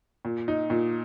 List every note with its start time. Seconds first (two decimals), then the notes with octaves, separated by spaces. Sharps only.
0.25 A#2
0.48 D#4
0.70 A#2